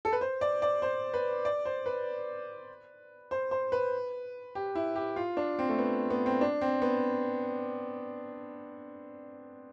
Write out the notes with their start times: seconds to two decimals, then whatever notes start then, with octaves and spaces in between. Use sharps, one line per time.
0.05 A4
0.13 B4
0.21 C5
0.41 D5
0.62 D5
0.82 C5
1.14 B4
1.45 D5
1.65 C5
1.86 B4
3.31 C5
3.51 C5
3.72 B4
4.55 G4
4.75 E4
4.95 G4
5.16 F4
5.37 D4
5.59 C4
5.69 A3
5.78 B3
6.10 B3
6.26 C4
6.41 D4
6.61 C4
6.82 B3